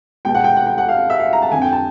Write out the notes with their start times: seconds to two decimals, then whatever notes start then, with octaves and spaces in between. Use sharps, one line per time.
0.25 C#2 B2 G5
0.35 F#5
0.44 G5
0.57 F#5
0.67 G5
0.78 F#5
0.89 F5
1.10 E5
1.20 F5
1.33 A#5
1.42 A5
1.51 F2 D3 G#5
1.62 G5
1.72 A5